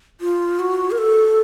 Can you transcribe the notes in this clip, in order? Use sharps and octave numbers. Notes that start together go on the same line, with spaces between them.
F4
F#4
A#4
A4